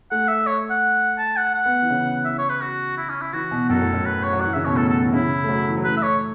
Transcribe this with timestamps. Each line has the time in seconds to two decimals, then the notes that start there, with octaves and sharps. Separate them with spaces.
0.11 A3 F#5
0.28 E5
0.47 C#5
0.70 F#5
1.18 A5
1.37 F#5
1.55 F#5
1.66 B3
1.82 E3
1.90 C#3
2.25 E5
2.38 C#5
2.50 B4
2.61 F#4
2.98 E4
3.09 C#4
3.21 E4
3.33 E3 F#4
3.51 B2
3.70 F#2 A4
3.82 A2
3.94 F#2
4.05 B4
4.23 C#5
4.33 F#3
4.41 E3 F#5
4.54 C#3 E5
4.65 B2 C#5
4.77 A2 A4
4.89 A4
5.03 E3
5.13 C#3 E4
5.44 A3
5.48 F#3
5.68 E3
5.77 F#3
5.84 A3 B4
5.97 E5
6.03 C#5